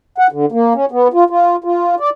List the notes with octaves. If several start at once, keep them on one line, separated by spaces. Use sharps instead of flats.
F#5
D3
A#3
C#4
B3
F4
F4
F4
D5